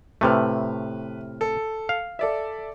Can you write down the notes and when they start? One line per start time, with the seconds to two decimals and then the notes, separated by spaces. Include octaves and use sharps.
0.21 A2 C3 A3 B4 F6
1.41 A4
1.89 F5
2.19 A4 D5 E5